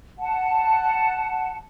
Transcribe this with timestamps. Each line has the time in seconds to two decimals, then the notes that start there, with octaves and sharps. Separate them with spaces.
0.19 F#5 A5